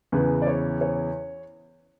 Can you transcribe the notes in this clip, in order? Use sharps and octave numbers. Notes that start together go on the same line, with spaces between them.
E2 C#3 E3 B4
D5
C#5
C#5